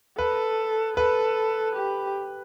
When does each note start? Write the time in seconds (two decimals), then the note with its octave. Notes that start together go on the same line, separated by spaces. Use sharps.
0.18 A4 B4
0.97 A4 B4
1.76 G4